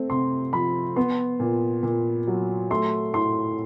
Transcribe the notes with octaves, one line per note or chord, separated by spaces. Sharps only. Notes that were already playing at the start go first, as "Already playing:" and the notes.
Already playing: A3 C4
C3 C6
F3 B5
B3 C6
A#2
A#2
F#3
A3 C6
A2 C6